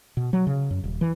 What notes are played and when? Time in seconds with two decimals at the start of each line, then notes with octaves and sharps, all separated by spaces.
0.17 B2
0.33 F#3
0.47 C#3
0.71 F#2
0.84 D#1
1.01 E3